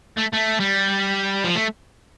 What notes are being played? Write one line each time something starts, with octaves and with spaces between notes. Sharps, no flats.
A3
A3
G3
F3
A3